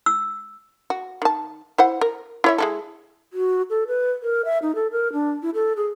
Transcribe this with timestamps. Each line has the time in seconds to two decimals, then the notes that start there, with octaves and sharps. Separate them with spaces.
0.06 E6
0.90 F#4
1.22 D#3 A5
1.78 E4 C5 F#5
2.01 A#4
2.44 E4 C#5 E5
2.58 G#3 E4 A4
3.33 F#4
3.70 A4
3.88 B4
4.23 A#4
4.45 E5
4.62 D#4
4.75 A4
4.92 A#4
5.13 D4
5.43 E4
5.54 A4
5.76 G#4